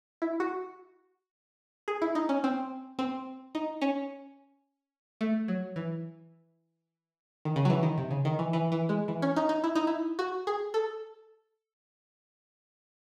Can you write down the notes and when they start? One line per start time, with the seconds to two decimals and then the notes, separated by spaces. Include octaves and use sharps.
0.22 E4
0.40 F#4
1.88 G#4
2.02 E4
2.15 D#4
2.29 C#4
2.44 C4
2.99 C4
3.55 D#4
3.81 C#4
5.21 A3
5.48 F#3
5.76 E3
7.45 D#3
7.56 C#3
7.65 F#3
7.70 E3
7.83 D#3
7.98 C3
8.11 C#3
8.25 D#3
8.39 E3
8.53 E3
8.72 E3
8.89 G#3
9.08 E3
9.22 C#4
9.36 D#4
9.49 D#4
9.64 E4
9.76 D#4
9.87 E4
10.19 F#4
10.47 G#4
10.74 A4